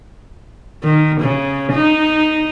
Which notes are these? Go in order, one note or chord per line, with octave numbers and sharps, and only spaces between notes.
D#3
C#3
D#4